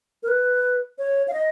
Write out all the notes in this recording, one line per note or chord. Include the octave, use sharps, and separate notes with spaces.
A#4
B4
C#5
F5
D#5